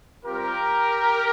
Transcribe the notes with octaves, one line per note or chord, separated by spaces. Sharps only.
G3 C4 F4 G4 A#4